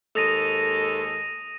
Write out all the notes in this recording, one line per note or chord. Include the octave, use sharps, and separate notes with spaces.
D#2 G#3 A4 D#6 A#6 D#7